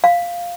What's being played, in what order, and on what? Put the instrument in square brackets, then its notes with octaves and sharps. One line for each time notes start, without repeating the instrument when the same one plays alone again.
[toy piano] F5